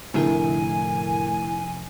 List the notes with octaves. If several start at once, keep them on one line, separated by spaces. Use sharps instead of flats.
F1 A2 D3 E4 G#4 A#4 G#5